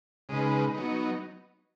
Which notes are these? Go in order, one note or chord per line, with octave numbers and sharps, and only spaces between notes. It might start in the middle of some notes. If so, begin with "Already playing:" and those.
C#3 G#3 D#4 B4
F#3 B3 D#4